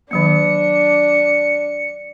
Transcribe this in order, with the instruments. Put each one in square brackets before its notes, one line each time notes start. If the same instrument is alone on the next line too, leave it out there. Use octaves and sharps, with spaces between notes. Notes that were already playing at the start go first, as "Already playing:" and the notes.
[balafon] D#3 F#3 A#3 [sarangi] D4 [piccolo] C#7